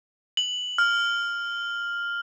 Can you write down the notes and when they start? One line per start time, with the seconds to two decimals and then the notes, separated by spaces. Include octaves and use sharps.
0.37 F#7
0.78 F6